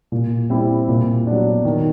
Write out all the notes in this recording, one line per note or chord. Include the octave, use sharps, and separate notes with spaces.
A#2
G3 C4 E4
A#2
F#3 B3 D4
D#3